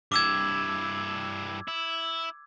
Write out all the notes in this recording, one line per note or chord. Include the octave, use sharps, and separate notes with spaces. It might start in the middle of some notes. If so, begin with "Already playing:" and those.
G2 E4 D6 E6 G#6
E4